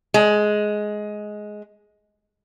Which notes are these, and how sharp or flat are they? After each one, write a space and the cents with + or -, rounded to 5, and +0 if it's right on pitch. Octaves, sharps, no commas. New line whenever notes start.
G#3 +10